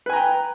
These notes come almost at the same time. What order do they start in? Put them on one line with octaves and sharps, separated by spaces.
B4 G#5 A#5 G5